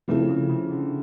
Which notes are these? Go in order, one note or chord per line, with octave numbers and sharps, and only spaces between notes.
C#3 F3 A3 C4 E4 A4
C#3
C#3
D3